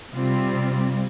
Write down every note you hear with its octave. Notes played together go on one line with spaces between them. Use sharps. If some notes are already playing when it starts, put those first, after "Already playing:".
C3 G3 C4 F4